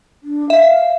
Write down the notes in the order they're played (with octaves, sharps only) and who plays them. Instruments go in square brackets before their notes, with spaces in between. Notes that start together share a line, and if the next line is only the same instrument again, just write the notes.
[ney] D4
[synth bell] E5 [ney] F5